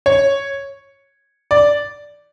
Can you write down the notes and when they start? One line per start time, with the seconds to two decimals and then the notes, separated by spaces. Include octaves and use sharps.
0.06 C#5
1.51 D5